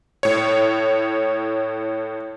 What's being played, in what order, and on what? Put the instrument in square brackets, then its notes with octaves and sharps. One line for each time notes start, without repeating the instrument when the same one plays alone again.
[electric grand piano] A2 C#5